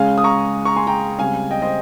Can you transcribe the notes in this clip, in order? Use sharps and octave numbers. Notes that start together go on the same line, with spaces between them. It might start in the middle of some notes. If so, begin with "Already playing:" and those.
Already playing: C#2 C#3 G#3 C#4 F5 G#5
D#6
A#5 C#6
A#5 C#6
G#5 C6
G5 A#5
C#2 C#3 G3 C4 F5 G#5
D#5 G5
C5 D#5